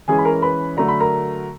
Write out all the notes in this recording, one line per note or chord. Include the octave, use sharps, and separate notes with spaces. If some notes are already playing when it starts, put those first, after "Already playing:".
E3 G#3 C#4 G#4 G#5
B5
A#4 A#5
B4 B5
D3 F#3 A3 A#5
B5
A#4 A#5